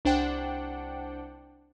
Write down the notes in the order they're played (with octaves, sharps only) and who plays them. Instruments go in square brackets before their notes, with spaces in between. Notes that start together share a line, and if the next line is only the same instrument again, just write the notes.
[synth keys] C2 D4 C5 F#5 G5